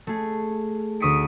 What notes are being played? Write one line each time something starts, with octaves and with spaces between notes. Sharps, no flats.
A3 G#4
D2 C#6 D#6 B6 C#7 D7